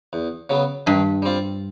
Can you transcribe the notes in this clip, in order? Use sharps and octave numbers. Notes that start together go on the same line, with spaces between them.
E2
C#3 F#3 B3
G2 D#3
G3 C4 F4